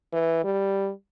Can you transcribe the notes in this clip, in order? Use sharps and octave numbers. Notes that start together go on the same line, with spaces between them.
E3
G3